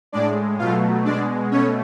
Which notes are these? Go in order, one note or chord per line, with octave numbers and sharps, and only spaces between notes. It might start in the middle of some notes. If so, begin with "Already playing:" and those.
A2 G#3 D4 D5
B2 F#3 A3 F4 F5
B2 G#3 D4 D5
B2 A3 C#4 C#5